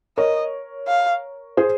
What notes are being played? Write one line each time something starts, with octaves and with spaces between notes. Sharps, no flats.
A#4 C#5 D#5
F5
G#4 C5